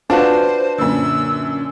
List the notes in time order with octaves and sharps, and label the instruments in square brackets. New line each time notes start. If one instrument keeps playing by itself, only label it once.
[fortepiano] D4 F4 F#4 [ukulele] B4 A5 [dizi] C5
[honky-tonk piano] F#2 A#2 D3 [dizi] E6